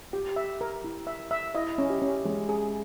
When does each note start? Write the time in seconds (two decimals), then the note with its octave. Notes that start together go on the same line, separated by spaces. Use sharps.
0.13 G4 G5
0.36 E5
0.61 A#4
0.84 E4
1.07 E5
1.31 E5
1.55 E4 D#5
1.78 C#4
1.90 G4
2.02 C#4
2.25 G#3 C#4
2.49 G#4